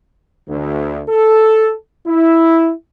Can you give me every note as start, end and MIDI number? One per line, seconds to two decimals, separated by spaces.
0.48 1.02 38
1.09 1.74 69
2.06 2.72 64